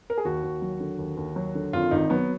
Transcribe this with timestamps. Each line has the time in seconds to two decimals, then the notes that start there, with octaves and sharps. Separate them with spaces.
0.10 A#4
0.18 G#4
0.25 D#2 F#4
0.44 D#2
0.62 F#3
0.80 D3
0.98 D#2
1.17 D#2
1.36 F#3
1.55 D3
1.73 G#1 F4
1.91 G#1 D#4
2.10 F#3 B3